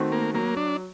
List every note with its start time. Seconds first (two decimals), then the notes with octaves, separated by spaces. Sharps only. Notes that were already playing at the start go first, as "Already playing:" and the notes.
Already playing: D#3 A3 C4 F#4
0.12 A#3
0.34 F#3 A#3
0.57 D4